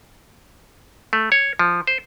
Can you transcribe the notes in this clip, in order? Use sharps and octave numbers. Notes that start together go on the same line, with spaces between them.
A3
C#5
F3
C5